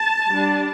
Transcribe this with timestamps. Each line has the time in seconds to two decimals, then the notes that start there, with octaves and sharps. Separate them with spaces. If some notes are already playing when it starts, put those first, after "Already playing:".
Already playing: A5
0.27 G3 D4